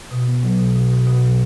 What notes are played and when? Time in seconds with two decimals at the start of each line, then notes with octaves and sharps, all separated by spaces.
0.11 B2
0.27 B3
0.43 F#3
0.59 B2
0.75 B2
0.91 B2
1.07 B2
1.23 F#3